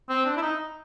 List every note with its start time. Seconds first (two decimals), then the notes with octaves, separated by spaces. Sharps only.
0.09 C4
0.25 D4
0.37 E4
0.42 D#4